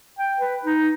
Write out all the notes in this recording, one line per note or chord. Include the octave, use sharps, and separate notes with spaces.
G5
B4
D#4